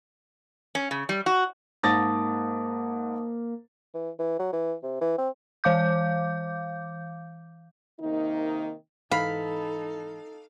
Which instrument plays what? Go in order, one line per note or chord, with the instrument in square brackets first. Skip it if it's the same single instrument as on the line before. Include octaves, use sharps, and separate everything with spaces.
[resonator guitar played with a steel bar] C#4
C#3
G3
F#4
[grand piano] G#2 A6 A#6 [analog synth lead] A#3 [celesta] A5 D6 D#6
[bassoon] E3
E3
F#3
E3
C3
E3
C4
[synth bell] E3 F5 D6 G6
[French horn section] C3 D#3 A#3 D#4
[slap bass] G#2 E3 [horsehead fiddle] D#4 A4 [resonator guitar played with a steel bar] F5 [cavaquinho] B5